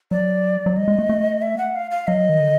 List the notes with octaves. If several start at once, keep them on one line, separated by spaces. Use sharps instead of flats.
F#3 D5
F#3
G3 D#5
G#3
A3
A3
E5
F#5
F5
F5
F#3 D#5
D#3
D3